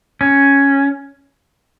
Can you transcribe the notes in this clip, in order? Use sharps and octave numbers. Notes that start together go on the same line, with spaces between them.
C#4